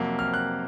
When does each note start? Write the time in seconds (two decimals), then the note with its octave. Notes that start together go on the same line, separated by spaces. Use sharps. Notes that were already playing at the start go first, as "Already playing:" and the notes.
Already playing: F2 C3 F#3 A#3
0.19 F6
0.34 F#6